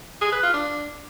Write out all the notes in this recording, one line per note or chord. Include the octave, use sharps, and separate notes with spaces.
G#4
B4
F4
D4